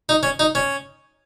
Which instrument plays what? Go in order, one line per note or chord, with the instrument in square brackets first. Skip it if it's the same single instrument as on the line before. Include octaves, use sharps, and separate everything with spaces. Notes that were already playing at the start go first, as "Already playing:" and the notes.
[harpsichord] D#4
C#4
D#4
C#4